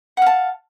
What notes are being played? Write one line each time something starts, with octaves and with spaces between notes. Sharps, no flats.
F5 F#5 A5